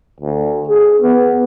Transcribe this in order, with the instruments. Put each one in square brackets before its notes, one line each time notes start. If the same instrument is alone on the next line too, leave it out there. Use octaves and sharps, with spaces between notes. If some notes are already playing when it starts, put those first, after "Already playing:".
[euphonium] D2
G#4
B3